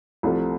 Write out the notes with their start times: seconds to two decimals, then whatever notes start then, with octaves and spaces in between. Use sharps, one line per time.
0.23 C2 C3 F3 A3